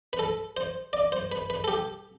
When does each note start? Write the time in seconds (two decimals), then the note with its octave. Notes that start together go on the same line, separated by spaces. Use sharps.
0.13 B4
0.19 A4
0.57 C5
0.93 D5
1.12 C5
1.32 B4
1.50 B4
1.64 A4
1.68 G4